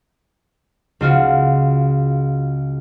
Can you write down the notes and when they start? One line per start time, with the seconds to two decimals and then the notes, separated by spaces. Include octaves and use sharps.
1.01 C#2 F4 F#4